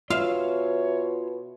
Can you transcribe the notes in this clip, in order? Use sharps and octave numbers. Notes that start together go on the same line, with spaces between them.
B2 F4 C#5 E5 F5